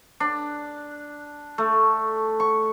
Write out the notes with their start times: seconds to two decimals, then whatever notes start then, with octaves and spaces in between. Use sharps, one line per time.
0.20 D4
1.58 A3
2.40 C#6